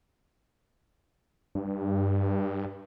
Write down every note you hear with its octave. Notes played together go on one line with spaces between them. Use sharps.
G2